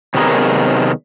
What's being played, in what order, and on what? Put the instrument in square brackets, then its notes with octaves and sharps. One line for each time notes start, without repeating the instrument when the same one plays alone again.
[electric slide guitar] C3 D#3 F#3 B3 G#4 A#4